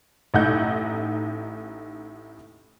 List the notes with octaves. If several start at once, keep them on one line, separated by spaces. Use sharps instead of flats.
A1 A2 D#4 F#5 G6